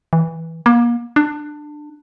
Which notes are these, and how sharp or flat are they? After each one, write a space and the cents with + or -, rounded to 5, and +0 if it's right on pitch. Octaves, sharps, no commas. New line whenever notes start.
E3 -10
A#3 +35
D4 +20